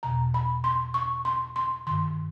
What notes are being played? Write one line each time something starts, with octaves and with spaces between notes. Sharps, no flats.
E2 B2 A#5
B5
C6
C#6
C6
C6
G2 D#3 C6